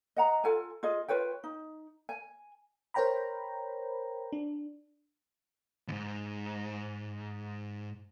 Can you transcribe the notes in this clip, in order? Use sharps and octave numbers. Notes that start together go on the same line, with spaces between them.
D#5 F#5 A#5
F4 A4 G#5
F4 G#4 D#5
F4 B4 C#5 G5
D#4
G#5
A#4 C5 C#5 G5 A#5 B5
D4
D#2 G#2